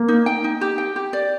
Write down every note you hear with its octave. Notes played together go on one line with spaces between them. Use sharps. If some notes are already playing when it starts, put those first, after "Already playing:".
Already playing: A#3
D#4
G5
D#4
G4
G5
G4
D5